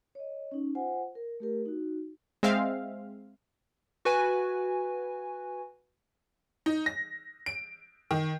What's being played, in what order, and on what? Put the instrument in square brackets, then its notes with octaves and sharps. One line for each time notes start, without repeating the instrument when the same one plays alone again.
[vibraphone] C#5 D#5
C#4 D#4
F4 C5 F#5 G#5
A#4
A3 G4 A#4
D#4 F#4
[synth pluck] G#3 C4 E5 F5
[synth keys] F#4 B4 G#5
[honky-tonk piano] D#4
A#6
D7
D#3